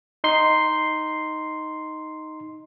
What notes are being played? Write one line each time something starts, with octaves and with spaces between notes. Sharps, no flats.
D#4 C6 C7